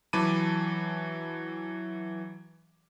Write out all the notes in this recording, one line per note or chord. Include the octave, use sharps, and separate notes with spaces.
E3 F#3 A5 B5 D6 D#7